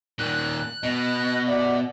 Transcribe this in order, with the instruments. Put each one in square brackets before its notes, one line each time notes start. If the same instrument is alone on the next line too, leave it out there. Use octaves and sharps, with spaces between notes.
[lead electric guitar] A#2 D#3 [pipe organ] F#6
[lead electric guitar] B2 [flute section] D#5
[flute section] D5 E5 F#5